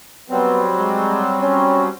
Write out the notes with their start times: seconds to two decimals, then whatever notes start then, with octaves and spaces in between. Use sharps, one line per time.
0.30 F#3 G3 B3 C4
0.78 G#3
1.41 C#4